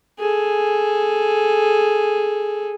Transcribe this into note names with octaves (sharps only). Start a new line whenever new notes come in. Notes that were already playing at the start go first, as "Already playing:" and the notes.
G#4 A4